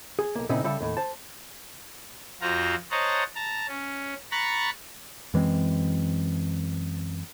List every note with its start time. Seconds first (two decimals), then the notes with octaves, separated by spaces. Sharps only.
0.19 G#4
0.35 B1 A#3
0.49 A#2 C#3 C4 D#4 E4
0.64 C#3 G3 A4 E5
0.80 D#2 A2
0.97 C5 A5
2.41 F2 F4 F#4 C5 A#5
2.91 C5 C#5 D#5 F#5 A5 A#5
3.35 A5 A#5
3.68 C#4
4.32 A#5 B5 C#6 F#6 A6
5.34 F#2 E3 G#3 C4